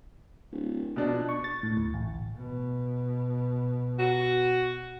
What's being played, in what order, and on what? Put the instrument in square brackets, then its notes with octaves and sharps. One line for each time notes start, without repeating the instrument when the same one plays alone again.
[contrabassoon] D1
[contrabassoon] A#1 [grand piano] B2 D4
[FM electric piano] C#6
A6
A2
D2
A1
[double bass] B2
[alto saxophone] F#4